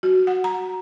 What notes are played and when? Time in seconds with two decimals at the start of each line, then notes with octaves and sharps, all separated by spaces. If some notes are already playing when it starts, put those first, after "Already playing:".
0.03 F#4
0.27 F#5
0.44 A#5